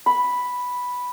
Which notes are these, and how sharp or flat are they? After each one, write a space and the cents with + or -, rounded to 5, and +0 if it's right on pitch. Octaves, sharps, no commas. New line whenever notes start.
B5 +0